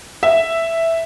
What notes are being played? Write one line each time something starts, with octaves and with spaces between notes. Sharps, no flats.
E5